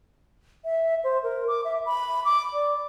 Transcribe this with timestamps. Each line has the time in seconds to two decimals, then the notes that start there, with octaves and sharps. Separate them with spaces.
0.65 E5
1.04 C5
1.23 A#4
1.48 D6
1.65 E5
1.86 B5
2.25 D6
2.53 D5